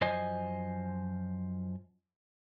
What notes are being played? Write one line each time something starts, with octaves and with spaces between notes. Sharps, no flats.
F#2 F3 C5 D#5 G#5